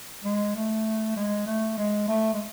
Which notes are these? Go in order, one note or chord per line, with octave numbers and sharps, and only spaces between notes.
G#3
A3
G#3
A3
G#3
A3
G#3